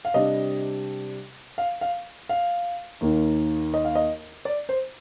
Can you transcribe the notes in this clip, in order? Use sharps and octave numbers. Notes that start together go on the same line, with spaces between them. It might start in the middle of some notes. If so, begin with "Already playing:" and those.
F5
C3 G3 D4 D#5
F5
F5
F5
D#2 D#3 A#3 D#4
D#5
F5
D#5
D5
C5